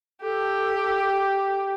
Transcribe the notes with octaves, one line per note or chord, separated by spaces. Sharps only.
G4 A4